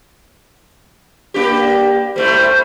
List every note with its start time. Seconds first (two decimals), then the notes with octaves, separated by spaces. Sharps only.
1.34 A#3 D4 G4
2.16 G3 A3 E4 C5